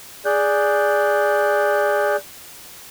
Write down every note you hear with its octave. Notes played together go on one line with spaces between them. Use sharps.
G#4 D5 F#6 G6